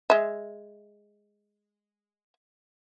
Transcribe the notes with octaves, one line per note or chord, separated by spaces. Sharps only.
G#3 E5